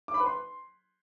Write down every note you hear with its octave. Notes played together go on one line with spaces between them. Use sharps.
D6
B5
B4
C6